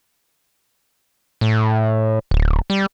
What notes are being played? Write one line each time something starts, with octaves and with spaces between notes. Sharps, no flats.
A2
D1
G3